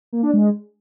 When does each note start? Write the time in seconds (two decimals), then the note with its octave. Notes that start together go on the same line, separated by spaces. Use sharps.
0.13 A#3
0.23 D4
0.33 G#3